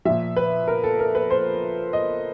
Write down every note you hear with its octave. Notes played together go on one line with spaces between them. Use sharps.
A#2 F3 E5
B4
A#4
A4
A#4
B4
C5
D#5